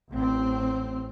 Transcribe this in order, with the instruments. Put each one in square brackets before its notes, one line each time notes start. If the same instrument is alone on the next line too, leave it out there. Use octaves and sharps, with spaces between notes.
[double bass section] A1 C4